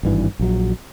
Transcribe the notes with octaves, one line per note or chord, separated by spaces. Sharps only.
G#1 G2 E3
A#1 F#3